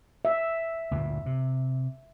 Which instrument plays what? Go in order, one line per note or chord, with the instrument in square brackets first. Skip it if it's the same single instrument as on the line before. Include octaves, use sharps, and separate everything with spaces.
[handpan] E5
[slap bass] D2 G2 A#2
C3